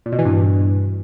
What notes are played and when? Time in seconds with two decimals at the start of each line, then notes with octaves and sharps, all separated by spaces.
0.06 A#2
0.12 B2
0.19 E3
0.25 G2